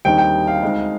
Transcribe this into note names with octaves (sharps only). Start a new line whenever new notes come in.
D#2 D3 G3 C4 D#4 G5
G5
F5
D2 D3 G#3 C4 D#4